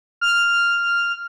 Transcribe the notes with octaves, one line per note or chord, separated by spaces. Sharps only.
F6